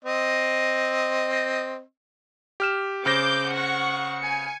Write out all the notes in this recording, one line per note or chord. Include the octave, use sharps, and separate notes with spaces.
C4 D#5
G4 F6 E7
C#3 C5 D6 G6 A#6
F#5 C#6
G#5 C#7